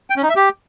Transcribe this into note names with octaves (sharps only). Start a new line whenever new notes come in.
G5
C#4
D#4
E5
G4